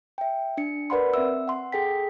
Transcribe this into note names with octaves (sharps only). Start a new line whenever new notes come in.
E5 G5
D4 C#7
A#4 B4 D5 F#5 B5 C6
C4 E5 E6
F#5 C6
G#4 A4 G5 B6